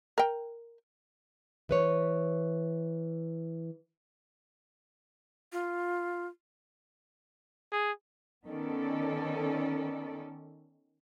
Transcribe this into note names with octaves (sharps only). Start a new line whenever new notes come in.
A#4 G5
E3 B4 C#5
F4
G#4
D#3 B3 C#4 A4 D5